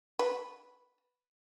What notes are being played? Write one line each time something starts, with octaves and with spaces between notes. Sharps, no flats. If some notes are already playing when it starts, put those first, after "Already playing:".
B4